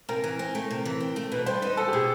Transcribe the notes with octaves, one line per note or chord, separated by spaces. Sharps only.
C3 A#4
E3
C4
A3
C3
E3
C4
A3
B2 B4
G3 C5
D#4 B4
B3 A4
G4
B2 G#4